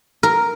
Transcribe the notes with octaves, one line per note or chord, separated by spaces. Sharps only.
A#4